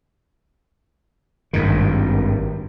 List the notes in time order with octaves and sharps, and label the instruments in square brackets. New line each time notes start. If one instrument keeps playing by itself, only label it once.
[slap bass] G#1 G2 D#3